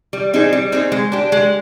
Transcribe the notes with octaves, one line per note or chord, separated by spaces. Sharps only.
G3
C4 D#4 G#4
G3
C4 D#4 G#4
G#3
D4 G4
G#3